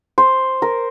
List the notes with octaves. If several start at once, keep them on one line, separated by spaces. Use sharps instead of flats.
C5
A#4